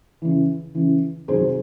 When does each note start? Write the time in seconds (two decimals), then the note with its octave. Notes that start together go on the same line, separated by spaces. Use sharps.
0.22 C#3 E3
0.75 C#3 E3
1.28 C3 D#3 F#3 G#4 C5